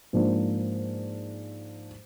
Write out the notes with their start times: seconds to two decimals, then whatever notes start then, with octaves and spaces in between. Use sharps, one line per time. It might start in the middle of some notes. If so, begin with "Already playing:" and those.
0.13 G#2 F3 A#3 D4